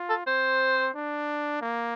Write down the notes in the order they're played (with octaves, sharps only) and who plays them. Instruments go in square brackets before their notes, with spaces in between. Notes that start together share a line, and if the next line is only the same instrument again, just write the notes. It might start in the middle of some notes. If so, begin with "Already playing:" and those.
Already playing: [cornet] F4
[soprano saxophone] A4
[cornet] C4 [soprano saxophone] C5
[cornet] D4
A#3